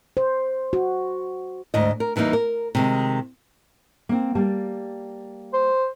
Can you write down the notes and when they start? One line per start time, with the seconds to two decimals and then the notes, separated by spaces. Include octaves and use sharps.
0.17 C5
0.73 F#4
1.74 D2 G#2 D4 D#5
2.00 A#4
2.16 E2 E3 G3 A#3 D#4
2.33 A#4
2.75 C3 D#3 G#3
4.09 A#3 C4
4.35 G3 A#3 A5
5.53 C5